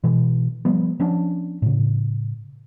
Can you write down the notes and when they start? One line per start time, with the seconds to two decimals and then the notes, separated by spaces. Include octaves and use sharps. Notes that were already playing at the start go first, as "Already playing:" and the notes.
0.04 B2 E3
0.65 F3 G3 B3
1.00 F3 B3 C#4 D4
1.62 A2 C#3